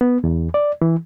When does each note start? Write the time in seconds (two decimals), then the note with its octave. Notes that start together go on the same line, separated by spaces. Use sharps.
0.01 B3
0.24 E2
0.54 D5
0.82 E3